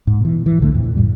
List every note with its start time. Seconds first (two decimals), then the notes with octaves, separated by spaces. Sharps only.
0.07 G#2
0.21 B2 E3
0.46 E3
0.61 C2 D3 A3
0.75 F2 A#2
0.96 F2 A2 G3